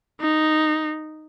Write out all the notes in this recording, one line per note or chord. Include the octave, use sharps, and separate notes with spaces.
D#4